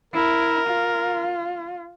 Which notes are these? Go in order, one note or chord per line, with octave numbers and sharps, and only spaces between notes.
E4 A#4
F4